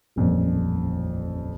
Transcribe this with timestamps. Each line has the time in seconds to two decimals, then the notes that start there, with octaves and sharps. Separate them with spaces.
0.16 D#1 A1 F2 A#2